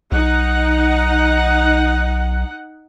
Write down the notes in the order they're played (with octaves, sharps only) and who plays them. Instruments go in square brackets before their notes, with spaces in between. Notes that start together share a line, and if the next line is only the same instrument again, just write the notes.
[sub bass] B1 [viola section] D#4 F#5